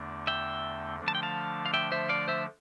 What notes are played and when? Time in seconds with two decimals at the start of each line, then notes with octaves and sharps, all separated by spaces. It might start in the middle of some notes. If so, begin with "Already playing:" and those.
Already playing: E2 D3 A3 D4
0.27 E5 G5
1.00 D3 F3 A3 D4
1.08 A5
1.15 G5
1.23 F5 A5
1.66 F5
1.74 E5 G5
1.92 C5 E5
2.09 D5 F5
2.28 C5 E5